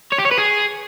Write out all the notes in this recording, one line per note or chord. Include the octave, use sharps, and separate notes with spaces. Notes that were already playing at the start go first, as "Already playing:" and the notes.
C#5
G4
C#5
B4
G#4